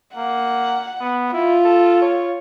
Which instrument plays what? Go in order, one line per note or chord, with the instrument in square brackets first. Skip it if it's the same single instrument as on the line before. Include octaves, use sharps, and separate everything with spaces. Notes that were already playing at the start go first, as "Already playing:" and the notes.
[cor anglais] A#3 [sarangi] F#5
[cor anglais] B3
[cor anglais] E4 [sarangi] F4
[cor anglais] A4
C#5